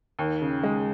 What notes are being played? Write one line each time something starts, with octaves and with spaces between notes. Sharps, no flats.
D#2
C#3
G#3